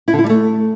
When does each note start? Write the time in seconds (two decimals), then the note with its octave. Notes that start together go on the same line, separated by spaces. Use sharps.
0.08 E4
0.13 D3
0.19 E4
0.24 G3
0.29 A3